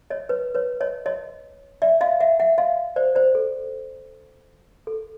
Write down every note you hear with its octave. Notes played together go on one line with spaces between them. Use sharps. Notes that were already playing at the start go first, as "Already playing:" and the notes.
C#5 D#5
B4 C#5
B4 C#5
C#5 D#5
C#5 D#5
D5 E5
D#5 F5
E5 F#5
E5 F#5
D#5 F5
C5 D5
C5 D5
A4
A4